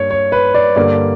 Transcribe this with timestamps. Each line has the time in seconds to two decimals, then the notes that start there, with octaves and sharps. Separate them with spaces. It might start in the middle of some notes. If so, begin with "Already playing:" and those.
Already playing: G2 A#3 C#5
0.11 C#5
0.32 B4
0.54 D5
0.76 G2 D3 A#3 D5